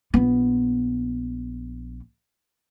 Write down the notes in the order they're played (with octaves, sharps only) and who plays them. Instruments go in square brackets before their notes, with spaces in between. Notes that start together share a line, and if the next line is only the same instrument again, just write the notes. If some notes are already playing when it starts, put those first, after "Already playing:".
[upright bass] A#1 B3